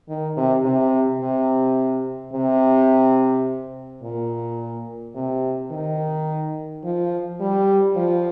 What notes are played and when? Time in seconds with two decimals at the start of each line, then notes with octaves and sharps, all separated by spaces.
0.09 D#3
0.37 C3
0.64 C3
1.21 C3
2.33 C3
4.03 A#2
5.15 C3
5.71 D#3
6.84 F3
7.40 G3
7.96 F3